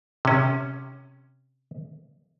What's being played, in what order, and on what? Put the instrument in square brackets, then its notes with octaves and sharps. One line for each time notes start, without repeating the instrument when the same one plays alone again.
[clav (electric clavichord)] C3 C#4